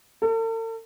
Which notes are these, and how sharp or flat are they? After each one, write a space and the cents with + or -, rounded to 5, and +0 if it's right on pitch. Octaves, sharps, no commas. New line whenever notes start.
A4 +45